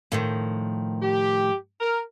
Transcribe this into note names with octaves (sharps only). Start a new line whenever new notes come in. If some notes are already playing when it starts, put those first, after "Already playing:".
A2 D#3 F3
G4
A#4